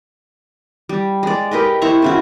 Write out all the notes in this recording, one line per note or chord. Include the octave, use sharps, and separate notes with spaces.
G3
G#3 D5
G4 A#4 B4 D#5
E4 C5 A#5 C#6
C#3 E4 F#4